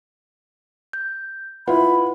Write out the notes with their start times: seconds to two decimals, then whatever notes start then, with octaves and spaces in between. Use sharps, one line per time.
0.93 G6
1.68 E4 F4 B4 F#5 B5